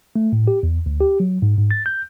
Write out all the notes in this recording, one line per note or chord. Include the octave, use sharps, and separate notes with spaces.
A3
A2
G4
E2
D2
G4
F#3
G#2
G#2
A6
G6